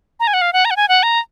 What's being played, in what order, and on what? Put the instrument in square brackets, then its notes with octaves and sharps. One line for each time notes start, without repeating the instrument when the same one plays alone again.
[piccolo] A#5
G#5
F#5
F5
F#5
A#5
F#5
G#5
F#5
A#5